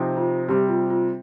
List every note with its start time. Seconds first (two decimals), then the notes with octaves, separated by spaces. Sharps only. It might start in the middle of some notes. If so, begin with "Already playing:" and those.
Already playing: C3 F3 C4 D#4
0.17 F4
0.49 C3 G3 C4 G4
0.69 F4
0.90 F4